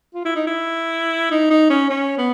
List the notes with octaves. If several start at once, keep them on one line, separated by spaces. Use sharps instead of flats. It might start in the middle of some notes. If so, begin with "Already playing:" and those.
F4
E4
D#4
E4
D#4
D#4
C#4
C#4
B3